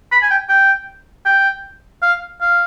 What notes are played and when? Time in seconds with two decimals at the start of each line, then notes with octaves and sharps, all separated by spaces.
0.12 B5
0.23 G#5
0.31 G5
0.49 G5
1.26 G5
2.02 F5
2.41 F5